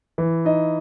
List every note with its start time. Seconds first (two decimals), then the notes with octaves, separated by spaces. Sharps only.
0.18 E3
0.45 D#4 D#5